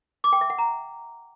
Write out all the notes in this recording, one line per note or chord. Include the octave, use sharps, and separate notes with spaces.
D6
G5
E5
F#5
A#5